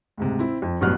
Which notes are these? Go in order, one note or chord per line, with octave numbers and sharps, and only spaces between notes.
D2 G#2 C3
C4 E4
F2
A1 G2 B2 F#3 F6 F#6